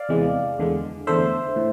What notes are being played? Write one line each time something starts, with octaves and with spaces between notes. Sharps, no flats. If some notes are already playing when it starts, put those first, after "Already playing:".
Already playing: D5 F5
E2 C3 E3 G#3
E2 D3 G#3
E2 D3 A3 C5 E5
A2